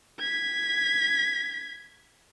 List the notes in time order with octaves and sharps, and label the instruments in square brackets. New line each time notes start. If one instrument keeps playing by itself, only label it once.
[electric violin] G#6 B6